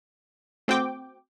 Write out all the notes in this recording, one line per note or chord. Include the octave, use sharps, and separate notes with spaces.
A3 C4 F#4 G5 D6